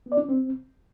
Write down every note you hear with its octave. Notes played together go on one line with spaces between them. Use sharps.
B3
D5
D4
C#4
C4